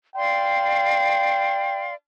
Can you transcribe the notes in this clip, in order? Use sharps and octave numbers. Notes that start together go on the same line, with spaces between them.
D5 F5 G5 C6